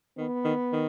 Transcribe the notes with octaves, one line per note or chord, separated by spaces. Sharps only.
D#3 B3
D#3
D#3